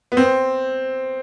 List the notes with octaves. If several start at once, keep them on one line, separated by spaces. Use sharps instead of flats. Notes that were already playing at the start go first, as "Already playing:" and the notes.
B3
C4